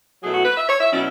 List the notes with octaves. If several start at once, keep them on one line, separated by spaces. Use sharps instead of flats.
B2 F#3 A3 E4 G#4
F#4
B4
E5
C#5
E5
B2 F#3 C#4 E4 D5